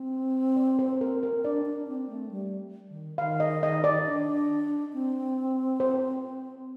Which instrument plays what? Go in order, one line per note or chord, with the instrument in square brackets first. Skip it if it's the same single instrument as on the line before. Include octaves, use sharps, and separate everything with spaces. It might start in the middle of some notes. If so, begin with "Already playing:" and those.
Already playing: [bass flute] C4
[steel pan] D5
C5
A#4
A#4
[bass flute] D4 [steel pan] D5
[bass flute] D4
C4
A3
G3
D#3
[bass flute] D#3 [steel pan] F5
[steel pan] D#5
D#5
D5
[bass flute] D4
C4
[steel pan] C5